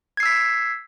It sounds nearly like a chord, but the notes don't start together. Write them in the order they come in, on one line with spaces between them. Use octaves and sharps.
G#6 C7 E6 B6